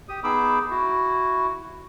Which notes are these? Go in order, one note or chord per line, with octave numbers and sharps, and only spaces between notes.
G4 D#6
B3 D#4 G#4 B5 D6 E6
E4 F#4